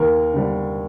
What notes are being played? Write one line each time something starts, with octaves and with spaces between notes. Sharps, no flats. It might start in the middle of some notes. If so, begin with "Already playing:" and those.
Already playing: D#2 A#4
D3 G3 D4